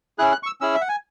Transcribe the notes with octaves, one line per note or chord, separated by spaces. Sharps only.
C#4 E4 G#4 F#6
F#6
C#6
E6
C#4 E4 G#4 E6
E5
F#5
G#5